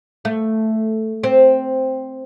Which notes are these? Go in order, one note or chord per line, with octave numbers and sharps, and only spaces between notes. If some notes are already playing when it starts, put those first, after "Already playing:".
A3
C4